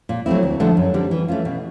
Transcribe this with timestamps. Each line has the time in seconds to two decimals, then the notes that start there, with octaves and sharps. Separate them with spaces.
0.09 A#2
0.26 F#3 A3 C4 E4
0.43 D2
0.60 D3 F3 A3 D4
0.77 F#2
0.94 D3 G3 C4
1.11 E3
1.28 A3 C#4 F4
1.45 B2